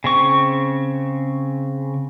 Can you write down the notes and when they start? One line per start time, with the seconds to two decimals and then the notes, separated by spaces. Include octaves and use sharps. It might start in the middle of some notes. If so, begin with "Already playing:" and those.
0.04 C#3 C4 C#6